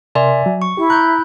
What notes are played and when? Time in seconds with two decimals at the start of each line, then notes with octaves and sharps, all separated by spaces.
0.15 C3 A#4 D5 E5 G#5 C6
0.46 F#3
0.62 C#6
0.77 E4 G4
0.90 A#5 F#6 G6